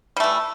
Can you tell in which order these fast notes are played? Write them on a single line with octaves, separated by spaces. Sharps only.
G3 A3 E3